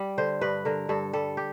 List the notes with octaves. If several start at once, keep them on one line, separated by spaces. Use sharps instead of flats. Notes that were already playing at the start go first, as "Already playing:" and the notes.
Already playing: G3
D3 C5
G2 B4
D3 A#4
G2 A4
G3 A4
G4